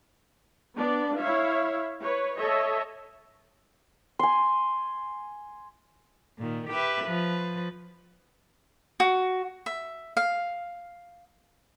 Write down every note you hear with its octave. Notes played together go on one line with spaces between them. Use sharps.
B3 D4 D5
E4 C#5 E5 F5
B4 C#5
A4 C#5 D#5 E5
G#5 C6
A#2 D#3
G4 B4 E5
F3 B4
F#4
E5
F5